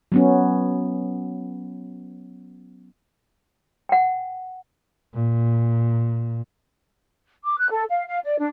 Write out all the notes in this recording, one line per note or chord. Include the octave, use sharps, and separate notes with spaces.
F#3 B3 C#4
F#5 G5
A#2
D6
F#6
A4
F5
F5
D5
D4